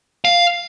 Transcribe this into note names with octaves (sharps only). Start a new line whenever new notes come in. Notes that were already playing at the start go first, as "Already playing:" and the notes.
F5